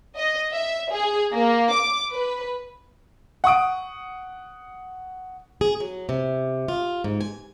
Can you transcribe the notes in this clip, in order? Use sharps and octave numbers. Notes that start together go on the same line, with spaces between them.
D#5
E5
G#4
A#3
D6
B4
F#5 C#6 D#6 D7
G#4
F#3
C3
F4
G#2
G#5